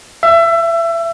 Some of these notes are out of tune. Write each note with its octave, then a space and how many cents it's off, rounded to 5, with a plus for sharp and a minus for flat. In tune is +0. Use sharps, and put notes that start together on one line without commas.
E5 +25